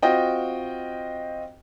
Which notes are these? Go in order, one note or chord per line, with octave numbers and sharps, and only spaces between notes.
C4 F4 F#4 D#5 G5